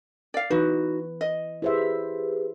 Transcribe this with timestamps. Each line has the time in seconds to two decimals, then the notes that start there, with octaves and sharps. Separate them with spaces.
0.34 D5 F5
0.50 E3 D#4 F#4 B4
1.21 D#5
1.62 E4 G4 G#4 B4 C5 E5